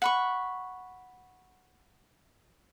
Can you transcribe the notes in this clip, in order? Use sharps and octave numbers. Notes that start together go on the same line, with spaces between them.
F#5 B5 C#6